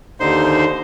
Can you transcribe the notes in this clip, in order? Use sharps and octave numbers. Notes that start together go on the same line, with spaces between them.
D#2 D3 D#4 C5 C6